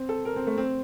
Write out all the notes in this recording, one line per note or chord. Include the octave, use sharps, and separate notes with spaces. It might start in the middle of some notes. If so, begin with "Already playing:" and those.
Already playing: C4
A4
A#4
C4
A3
C4